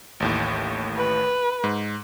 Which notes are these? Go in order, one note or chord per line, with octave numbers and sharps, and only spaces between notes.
A1 D#2 A2
B4
G#2